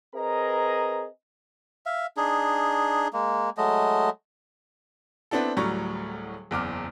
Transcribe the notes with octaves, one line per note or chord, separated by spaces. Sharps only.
C4 G#4 A#4 B4 D#5 A#5
E5 F5
D4 D#4 G#4
G#3 A#3
F#3 G#3 A3 D#5
B3 C4 D4 E4 A4
D1 A2 F#3 G3 A#5 C#6
F#1 E2 D6 F6